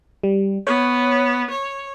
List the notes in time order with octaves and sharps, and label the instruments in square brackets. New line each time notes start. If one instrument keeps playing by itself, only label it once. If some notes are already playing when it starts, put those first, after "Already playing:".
[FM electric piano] G3
[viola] B3 [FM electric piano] C#5
[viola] C#5